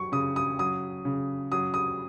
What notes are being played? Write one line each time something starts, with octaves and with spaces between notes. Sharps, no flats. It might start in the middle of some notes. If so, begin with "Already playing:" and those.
Already playing: F#3 C#6
C#3 D#6
D#6
F#3 D#6
C#3
F#3 D#6
D#6